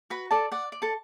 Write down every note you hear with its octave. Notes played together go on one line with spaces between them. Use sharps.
F#4 B4 B5
A4 D5 A5
D5 F#5
D5
A4 A5